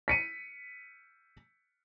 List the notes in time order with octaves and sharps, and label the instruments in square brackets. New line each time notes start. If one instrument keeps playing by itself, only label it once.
[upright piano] B6 C#7 D#7